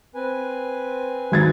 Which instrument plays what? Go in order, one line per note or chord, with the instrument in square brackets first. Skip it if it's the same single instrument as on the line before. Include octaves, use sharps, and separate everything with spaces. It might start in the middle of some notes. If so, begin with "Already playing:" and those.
[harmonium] C4 B4 G#5
[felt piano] G#1 G#6 A6